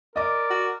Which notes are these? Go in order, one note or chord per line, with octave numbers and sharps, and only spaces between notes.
A#4 D5 D#5 D6
F#4